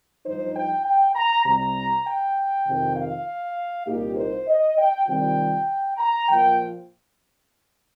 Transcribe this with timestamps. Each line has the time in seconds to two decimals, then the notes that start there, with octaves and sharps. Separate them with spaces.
0.24 G2 F3 D#4 C5
0.55 G5
0.84 G5
1.15 A#5
1.46 C2 C3 G3 A#5
2.05 G5
2.67 F2 C3 D#3
2.97 F5
3.87 C2 A#2 A#3 D#4 G4
4.17 C5
4.48 D#5
4.78 G5
5.08 C3 D#3 G3 C4 F4 G5
5.98 A#5
6.29 A#2 F3 A#3 F4 G5